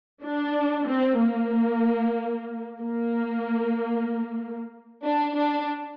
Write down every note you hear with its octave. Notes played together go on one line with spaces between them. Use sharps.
D4
C4
A#3
A#3
D4
D4